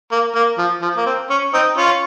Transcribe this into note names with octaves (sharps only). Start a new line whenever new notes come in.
A#3
A#3
F3
F3
A#3
C4
C#4
C4 D#4
C#4 F4